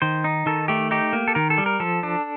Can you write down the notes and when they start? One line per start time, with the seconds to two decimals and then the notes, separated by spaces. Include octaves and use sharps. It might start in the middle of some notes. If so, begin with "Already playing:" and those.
0.02 D#3 C5
0.24 D#4
0.46 D#3 A4
0.68 A3 G4
0.91 D#4 G4
1.13 A#3
1.28 A4
1.35 D#3 A#4
1.50 A4
1.58 G3
1.66 A#4
1.80 F3 A4
2.03 D4